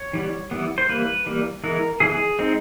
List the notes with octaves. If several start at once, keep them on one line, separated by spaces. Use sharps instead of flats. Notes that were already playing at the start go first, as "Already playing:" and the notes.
Already playing: C#5
E3 G3 B3
E3 G3 B3
C5
E3 G3 A#3 B4
E3 G3 A#3
E3 G#3 B3 A#4
E3 G#3 B3 G#4
G#3 C4 D#4